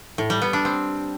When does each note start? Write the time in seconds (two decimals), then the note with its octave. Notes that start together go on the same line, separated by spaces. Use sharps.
0.18 A2
0.30 G3
0.42 B3
0.53 D4
0.65 C4